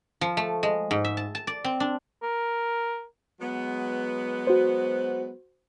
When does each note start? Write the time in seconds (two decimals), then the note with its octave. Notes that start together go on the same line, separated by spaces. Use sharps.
0.21 F3
0.37 A3
0.63 G#3
0.91 G#2
1.05 E5
1.17 A5
1.35 A5
1.47 D5
1.65 C4
1.80 D4
2.23 A#4
3.41 F#3 G#3 B3
4.47 F#4 C5